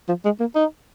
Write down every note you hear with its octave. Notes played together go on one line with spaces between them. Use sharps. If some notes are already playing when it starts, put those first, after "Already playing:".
F3
G#3
A#3
D#4